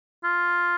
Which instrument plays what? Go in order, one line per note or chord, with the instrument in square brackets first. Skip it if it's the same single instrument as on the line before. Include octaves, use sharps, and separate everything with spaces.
[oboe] F4